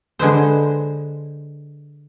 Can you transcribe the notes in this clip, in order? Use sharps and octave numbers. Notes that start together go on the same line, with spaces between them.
D3 G#3 B4 C5